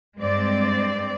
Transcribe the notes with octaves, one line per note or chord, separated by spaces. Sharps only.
G2 G#3 C4 D5